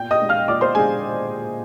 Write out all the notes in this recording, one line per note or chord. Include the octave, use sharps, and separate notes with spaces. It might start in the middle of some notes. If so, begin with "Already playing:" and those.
Already playing: A#2 G5 G6
D#5 D#6
G#3 D4
F5 F6
A#2 D5 D6
C5 C6
G#3 D4 G#4 G#5